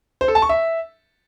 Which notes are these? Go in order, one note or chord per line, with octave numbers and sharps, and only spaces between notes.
C5
A4
A5
C#6
E5